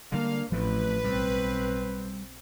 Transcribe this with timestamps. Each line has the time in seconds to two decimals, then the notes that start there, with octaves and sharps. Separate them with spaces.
0.12 D3 G3 G#3 A#3 D4 F5
0.52 A1 F3 A3 C4 B4
1.04 B1 G3 C4